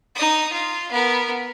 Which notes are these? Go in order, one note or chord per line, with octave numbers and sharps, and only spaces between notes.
D#4 D#6
F4
B3 A#4